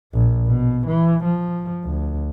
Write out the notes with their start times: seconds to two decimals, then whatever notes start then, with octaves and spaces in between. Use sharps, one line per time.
0.13 A#1
0.47 B2
0.87 E3
1.25 F3
1.85 D2